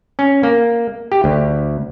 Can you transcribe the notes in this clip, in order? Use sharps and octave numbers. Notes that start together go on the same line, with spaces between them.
C#4
A#3
G4
D2